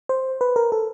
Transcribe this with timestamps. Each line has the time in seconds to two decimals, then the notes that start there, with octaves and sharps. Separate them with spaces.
0.09 C5
0.41 B4
0.56 A#4
0.72 A4